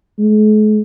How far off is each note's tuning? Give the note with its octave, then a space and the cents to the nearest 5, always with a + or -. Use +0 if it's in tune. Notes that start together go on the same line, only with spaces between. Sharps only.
G#3 +45